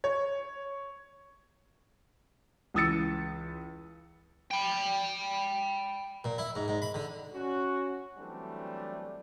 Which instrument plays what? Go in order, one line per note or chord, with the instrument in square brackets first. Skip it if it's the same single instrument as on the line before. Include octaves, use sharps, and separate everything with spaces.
[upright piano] C#5
[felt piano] C#2 E3 D#6 E6 A6 C#7
[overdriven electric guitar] G5 B5
[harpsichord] A#2
E4
G#2
G#2
B5
D3
[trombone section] C#4 F#4
E3 F#3 G3 A3 C4 D4